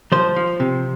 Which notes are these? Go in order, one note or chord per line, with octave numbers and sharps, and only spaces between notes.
F3 C5
F3
C3